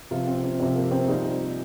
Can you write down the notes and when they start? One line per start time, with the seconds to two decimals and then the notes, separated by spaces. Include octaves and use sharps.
0.11 C3 F3 F4
0.28 C4
0.44 C4
0.59 C3 F3 C4
0.76 A#3
0.91 C4
1.08 A#2 G3 D#4